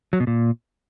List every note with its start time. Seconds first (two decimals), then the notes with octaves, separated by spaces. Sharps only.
0.13 F#3
0.20 B2
0.27 A#2